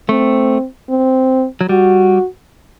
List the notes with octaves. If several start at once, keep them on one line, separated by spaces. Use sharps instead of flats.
A3 C4
C4
F#3
G3 F#4